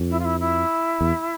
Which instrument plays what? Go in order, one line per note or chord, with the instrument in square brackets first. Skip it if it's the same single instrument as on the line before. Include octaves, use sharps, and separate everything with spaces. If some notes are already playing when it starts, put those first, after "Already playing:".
Already playing: [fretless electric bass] F2
[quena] E4
F4
E4
E4
[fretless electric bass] E2